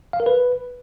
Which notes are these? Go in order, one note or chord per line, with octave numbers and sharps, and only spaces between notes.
F5
A#4
B4